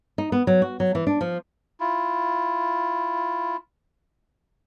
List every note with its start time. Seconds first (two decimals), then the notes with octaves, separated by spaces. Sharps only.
0.18 D#4
0.32 B3
0.47 F#3
0.62 F#4
0.80 F#3
0.95 E3
1.07 D4
1.21 F3
1.80 E4 F4